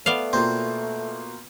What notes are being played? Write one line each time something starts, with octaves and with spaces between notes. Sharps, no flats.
A3 B3 D5 F5
B2 A#3 C4 F4